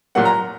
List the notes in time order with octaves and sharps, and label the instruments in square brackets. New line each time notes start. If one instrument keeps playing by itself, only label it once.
[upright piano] A#2 F#3 A#3 F#5
A#5